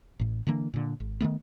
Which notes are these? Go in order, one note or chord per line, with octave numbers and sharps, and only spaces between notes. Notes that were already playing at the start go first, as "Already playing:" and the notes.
A1 A2
D3 E3 A#3 D4
A#2 D3
G#1
D#3 F3 A3 B3